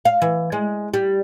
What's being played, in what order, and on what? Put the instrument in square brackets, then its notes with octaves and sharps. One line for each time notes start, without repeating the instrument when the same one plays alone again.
[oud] F5
E3
G#3
G3